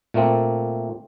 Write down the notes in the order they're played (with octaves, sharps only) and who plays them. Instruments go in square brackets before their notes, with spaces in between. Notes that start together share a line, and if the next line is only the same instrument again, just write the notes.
[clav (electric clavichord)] A#2 A3 A#3 C4